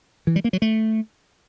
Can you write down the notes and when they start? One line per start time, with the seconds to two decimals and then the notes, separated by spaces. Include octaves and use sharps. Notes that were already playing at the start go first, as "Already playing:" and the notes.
0.27 E3
0.36 G3
0.44 A#3
0.53 F#3
0.62 A3